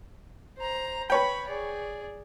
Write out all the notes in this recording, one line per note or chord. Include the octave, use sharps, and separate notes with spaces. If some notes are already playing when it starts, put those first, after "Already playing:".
C5 A#5
B4 C#5 G5 B5
G#4 D5